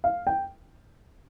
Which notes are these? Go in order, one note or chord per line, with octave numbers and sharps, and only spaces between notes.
F5
G5